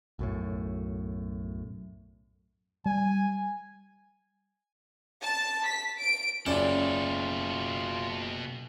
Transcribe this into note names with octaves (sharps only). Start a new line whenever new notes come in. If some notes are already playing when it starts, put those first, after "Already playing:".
B1 F#2 A2
G3 G#5
A5
B6
D7
F#1 B2 C#4 F4 A4 D5 A5